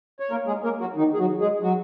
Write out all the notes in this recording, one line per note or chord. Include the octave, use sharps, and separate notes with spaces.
C#5
A#3 A#4
G#3 G#4
A#3 A#4
F#3 F#4
D#3 D#4
G#4
F#3 F#4
G#3 G#4
F#3 F#4